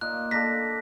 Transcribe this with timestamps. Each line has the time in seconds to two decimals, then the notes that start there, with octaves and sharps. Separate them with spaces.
0.01 A#2 A#3 D#4 F#6
0.31 A#3 D4 A4 A#6 B6